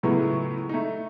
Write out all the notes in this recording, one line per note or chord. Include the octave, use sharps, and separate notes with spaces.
C#2 A2 F#3 G#3 A3 B3
A3 D#4